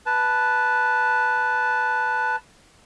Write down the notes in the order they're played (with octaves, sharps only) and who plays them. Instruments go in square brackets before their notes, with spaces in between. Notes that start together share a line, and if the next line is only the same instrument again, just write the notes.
[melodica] B4 A5